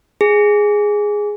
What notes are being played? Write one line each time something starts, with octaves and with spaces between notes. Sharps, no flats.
G#4